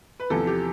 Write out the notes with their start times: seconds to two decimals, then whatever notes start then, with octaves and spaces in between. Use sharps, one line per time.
0.20 B4
0.30 E2 C3 F3 A4
0.47 G4